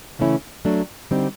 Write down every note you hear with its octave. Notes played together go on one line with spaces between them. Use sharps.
C#3 E3 A3 C#4 E4
F#3 A3 D4
D3 G3 C4 D#4